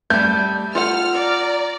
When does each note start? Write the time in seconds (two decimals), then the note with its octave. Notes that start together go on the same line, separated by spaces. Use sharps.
0.10 G3 A3 G6
0.75 F4 A4 F#5 F6
1.14 D5 A#5